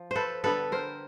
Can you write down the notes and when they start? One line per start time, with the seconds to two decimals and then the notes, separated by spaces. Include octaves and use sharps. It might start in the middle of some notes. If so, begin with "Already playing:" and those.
Already playing: F3
0.11 A4 B4 C5
0.44 D3 G3 B3 A4 B4
0.72 A#4 C5